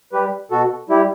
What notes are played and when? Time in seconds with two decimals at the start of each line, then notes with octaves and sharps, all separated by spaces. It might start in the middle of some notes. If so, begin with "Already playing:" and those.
0.12 G3 G4 B4
0.51 B2 F#4 A4
0.89 G3 E4 G4